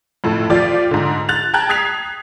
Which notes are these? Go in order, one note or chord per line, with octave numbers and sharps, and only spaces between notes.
F2 A2 A4
F3 F4 G4 D5
G#2 D3
F#6 A6 F7
G5 A5 A#5 F#6 G#6
D#6 G#6 B6 C7 F7